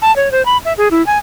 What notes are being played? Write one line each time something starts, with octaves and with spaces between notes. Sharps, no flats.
A5
C#5
C5
B5
E5
G#4
E4
G#5